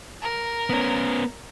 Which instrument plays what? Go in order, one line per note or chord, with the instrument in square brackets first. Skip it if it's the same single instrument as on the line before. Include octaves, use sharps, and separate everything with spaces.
[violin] A#4
[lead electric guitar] B3 C#4